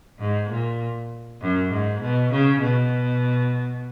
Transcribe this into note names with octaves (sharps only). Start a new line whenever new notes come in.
G#2
A#2
F#2
G#2
B2
C#3
B2